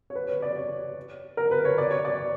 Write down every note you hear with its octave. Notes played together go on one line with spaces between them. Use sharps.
C#5
B4
C#5
D5
C#5
A#4
B4
C#5
D5
C#5
D5